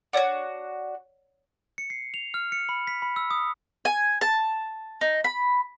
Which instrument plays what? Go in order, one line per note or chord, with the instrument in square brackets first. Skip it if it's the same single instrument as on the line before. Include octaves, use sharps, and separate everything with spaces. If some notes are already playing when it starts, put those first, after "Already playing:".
[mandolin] D4 F#4 [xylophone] C#5 D5 F#5
[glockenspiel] C#7
C7
F7
F6
C#7
B5
B6
B5
E6
D#6
[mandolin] G#5
A5
D#4
B5